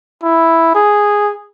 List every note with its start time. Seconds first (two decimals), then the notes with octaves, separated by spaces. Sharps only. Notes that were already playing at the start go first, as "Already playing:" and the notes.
0.23 E4
0.75 G#4